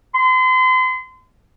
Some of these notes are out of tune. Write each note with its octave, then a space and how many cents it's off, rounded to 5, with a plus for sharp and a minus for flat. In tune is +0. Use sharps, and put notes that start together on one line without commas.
C6 -35